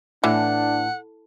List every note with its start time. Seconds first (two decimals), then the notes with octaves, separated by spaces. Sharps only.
0.24 A2 E3 D4 F#5